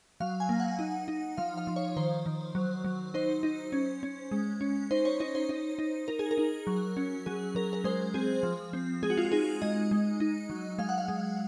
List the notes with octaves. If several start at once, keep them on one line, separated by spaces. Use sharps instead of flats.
F#3 F5
G#5
A#3
F#5
D#4
D#4
F3 F5
F5
F3
C#5
D#3 C5
D#3
F#3
F#3
D#4 C5
D#4
C#4
C#4
G#3
C#4
D#4 C5
C#5
D#4 C#5
C5
D#4
D#4
D#4 A#4
G#4
A#4
D#4
F#3
C#4
F#3 G#4
F#3 A#4
A#4
G#3 C5
C4 G#4
F3
C4
G#3 G#4
F#4
F4
F#4
D#4 G#4
G#3 D#5
G#3
D#4
F#3
G#3 F5
F#5
F5
G#3